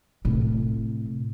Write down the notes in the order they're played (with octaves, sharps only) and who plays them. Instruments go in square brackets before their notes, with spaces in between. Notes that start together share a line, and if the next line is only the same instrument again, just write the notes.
[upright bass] A2 C3